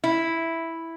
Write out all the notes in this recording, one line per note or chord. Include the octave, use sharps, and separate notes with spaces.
E4